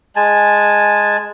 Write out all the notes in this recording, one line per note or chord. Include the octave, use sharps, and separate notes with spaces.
G#3 G#5 A5